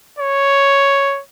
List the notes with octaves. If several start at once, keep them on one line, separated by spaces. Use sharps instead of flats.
C#5